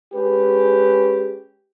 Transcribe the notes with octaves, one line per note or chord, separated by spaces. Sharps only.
G#3 C#4 G4 G#4 B4